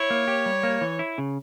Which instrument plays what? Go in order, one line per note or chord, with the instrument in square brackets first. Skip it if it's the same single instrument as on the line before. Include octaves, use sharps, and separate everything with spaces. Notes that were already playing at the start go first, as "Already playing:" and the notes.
Already playing: [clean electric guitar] E4 [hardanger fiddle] C#5
[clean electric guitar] A#3
G4
G3
A#3
E3
E4
C#3